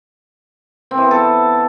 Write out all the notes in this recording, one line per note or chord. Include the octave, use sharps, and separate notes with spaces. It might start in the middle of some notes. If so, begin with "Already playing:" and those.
C4
E3
B3
A4